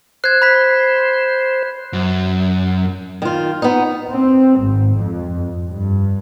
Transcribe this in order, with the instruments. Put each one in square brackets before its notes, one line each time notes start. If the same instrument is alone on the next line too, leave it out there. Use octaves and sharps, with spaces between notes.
[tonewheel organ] C5 [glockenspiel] F#6 G#6
[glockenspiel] B5 B6
[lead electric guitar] F#2
[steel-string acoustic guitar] D#3 F4
B3 D#4
[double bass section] C4
G#1
F2
G2